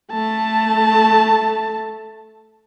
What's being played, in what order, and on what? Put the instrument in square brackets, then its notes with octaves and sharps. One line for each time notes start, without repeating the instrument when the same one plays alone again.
[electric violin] A3 A5